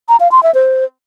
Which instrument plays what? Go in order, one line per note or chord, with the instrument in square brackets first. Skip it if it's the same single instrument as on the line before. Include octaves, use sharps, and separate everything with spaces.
[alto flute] A#5
F5
C6
E5
C5